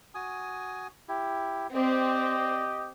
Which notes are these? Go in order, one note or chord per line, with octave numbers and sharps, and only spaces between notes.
F#4 G#5 D#6
E4 G4
C4 G4 D5 D#5